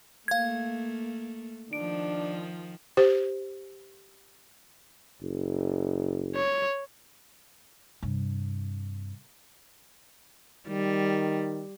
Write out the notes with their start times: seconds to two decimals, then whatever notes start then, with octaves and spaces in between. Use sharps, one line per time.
0.28 A3 A#3 F5 G#6
1.73 D#3 F3 D4 D7
2.97 G4 C5
5.22 F#1
6.35 C#5
8.02 G2 C3
10.68 D#3 G3